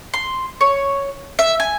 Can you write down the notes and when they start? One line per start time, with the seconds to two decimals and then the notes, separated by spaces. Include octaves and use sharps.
0.14 C6
0.61 C#5
1.39 E5
1.60 G#5